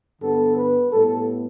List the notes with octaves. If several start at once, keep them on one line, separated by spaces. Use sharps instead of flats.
G2 D3 G3 B3 A4
B4
A2 G3 B3 A4